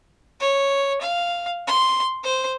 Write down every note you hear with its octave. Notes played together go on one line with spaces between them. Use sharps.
C#5
F5
C6
C5